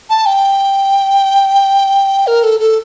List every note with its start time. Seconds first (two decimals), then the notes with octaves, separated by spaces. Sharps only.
0.10 A5
0.26 G5
2.27 A#4
2.43 A4
2.60 A4